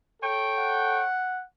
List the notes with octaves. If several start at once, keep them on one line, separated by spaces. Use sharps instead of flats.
A4 C#5 G5
F#5